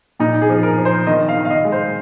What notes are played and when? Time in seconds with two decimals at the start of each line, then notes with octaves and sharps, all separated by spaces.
0.19 A#2 D#4
0.42 G#4
0.49 F3
0.63 A#4
0.78 F3
0.85 C5
1.07 D#3 D#5
1.29 F5
1.36 D#3
1.45 F5
1.51 D#5
1.65 G#3
1.72 C5